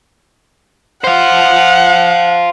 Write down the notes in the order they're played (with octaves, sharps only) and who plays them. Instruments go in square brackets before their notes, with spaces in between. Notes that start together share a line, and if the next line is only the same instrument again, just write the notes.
[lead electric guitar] C5 F5 [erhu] F#5